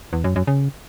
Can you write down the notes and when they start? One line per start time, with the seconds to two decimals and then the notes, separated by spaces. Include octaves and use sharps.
0.13 E2
0.24 F#2
0.36 F#2
0.47 C#3